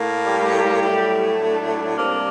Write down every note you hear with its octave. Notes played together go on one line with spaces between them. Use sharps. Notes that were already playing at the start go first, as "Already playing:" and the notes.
Already playing: A2 A#3
G3 G4
A2 F#3 A3
D4
C3 G3 A#3